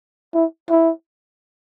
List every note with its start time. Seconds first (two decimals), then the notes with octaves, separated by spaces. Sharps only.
0.34 E4
0.70 E4